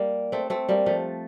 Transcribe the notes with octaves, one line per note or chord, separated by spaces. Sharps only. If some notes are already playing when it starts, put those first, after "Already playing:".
Already playing: G3 A#3
A3 C4
A3 C4
G3 A#3
F3 A3